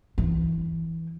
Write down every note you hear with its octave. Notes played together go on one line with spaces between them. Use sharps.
E3